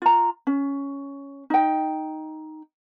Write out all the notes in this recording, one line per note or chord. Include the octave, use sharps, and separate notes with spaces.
F4 A#5
C#4
D#4 G5